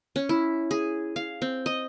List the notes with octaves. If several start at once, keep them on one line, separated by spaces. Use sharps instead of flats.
C#4
E4
G#4
F5
C4
D#5